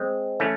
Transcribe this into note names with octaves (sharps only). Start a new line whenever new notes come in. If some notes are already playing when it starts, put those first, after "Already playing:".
Already playing: G#3 C4
E3 A3 C#4